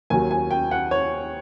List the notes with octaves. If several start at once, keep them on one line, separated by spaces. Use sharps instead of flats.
D#2 D#3 F#3 G#5
G#5
G5
F#5
C#5